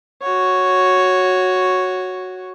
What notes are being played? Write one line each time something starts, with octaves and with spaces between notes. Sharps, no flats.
F#4 C#5